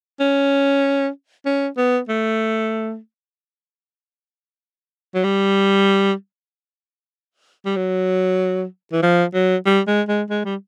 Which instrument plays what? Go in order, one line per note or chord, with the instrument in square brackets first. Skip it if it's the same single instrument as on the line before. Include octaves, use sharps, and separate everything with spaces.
[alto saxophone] C#4
C#4
B3
A3
F#3
G3
G3
F#3
E3
F3
F#3
G3
G#3
G#3
G#3
G3